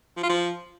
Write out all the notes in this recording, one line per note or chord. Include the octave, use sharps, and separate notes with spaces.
F3
F4
F3